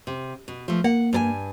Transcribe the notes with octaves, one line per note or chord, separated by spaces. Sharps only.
C3
B2
F3 A3
A#3 F#5
G2 A#4 G#5